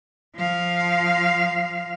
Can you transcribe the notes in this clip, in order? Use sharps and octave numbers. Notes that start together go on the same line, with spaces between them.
F3 F5